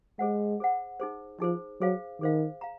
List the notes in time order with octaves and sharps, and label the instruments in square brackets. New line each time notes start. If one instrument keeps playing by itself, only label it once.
[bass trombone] G#3 [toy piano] G#4 C5 F#5
[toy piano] G#4 C5 F#5
D#4 G#4 C5
[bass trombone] F3 [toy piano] D#4 G#4 C5
[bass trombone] F#3 [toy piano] G#4 C5 F5
[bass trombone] D#3 [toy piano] G#4 C5 F5
[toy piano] F5 A#5